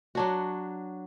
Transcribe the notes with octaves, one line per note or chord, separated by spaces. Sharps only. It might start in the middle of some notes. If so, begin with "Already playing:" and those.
F#3 D4 F#4